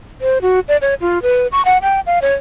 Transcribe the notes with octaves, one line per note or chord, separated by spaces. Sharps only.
C5
F#4
D5
C#5
F4
B4
C#6
F#5
G5
F5
C#5